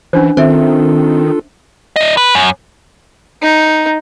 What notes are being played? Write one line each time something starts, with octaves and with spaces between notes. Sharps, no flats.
E3 C#4 D4 C5
D#3 C4 D4 F4 A4 C5 E5
E4 D#5
B4
F#2
D#4